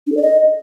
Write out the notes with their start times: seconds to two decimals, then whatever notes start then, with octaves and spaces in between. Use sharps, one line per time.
0.07 D4
0.12 A4
0.17 D5
0.22 D#5